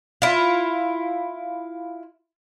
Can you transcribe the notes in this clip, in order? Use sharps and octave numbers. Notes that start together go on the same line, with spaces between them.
E4 F4